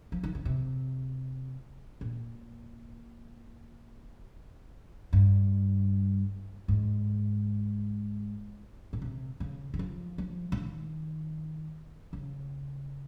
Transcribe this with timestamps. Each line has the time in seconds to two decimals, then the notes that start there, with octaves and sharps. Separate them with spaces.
0.12 F3
0.23 D#3
0.35 C#3
0.45 C3
2.01 A#2
5.13 G2
6.68 G#2
8.93 A#2
9.02 C3
9.40 C#3
9.74 D#3
9.79 F3
10.18 F3
10.52 C#3
10.58 D#3
12.13 C#3